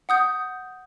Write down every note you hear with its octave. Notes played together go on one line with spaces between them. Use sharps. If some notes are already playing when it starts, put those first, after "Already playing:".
F#5 D#6 G6